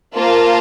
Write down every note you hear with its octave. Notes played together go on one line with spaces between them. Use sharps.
A#3 F4 C5 F5 A5